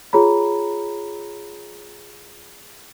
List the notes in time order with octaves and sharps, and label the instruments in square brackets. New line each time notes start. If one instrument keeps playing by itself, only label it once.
[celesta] F4 G#4 C#5 A#5 B5